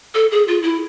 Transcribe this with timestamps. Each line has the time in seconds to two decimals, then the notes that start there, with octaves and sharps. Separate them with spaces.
0.14 A4
0.32 G#4
0.48 F4
0.62 E4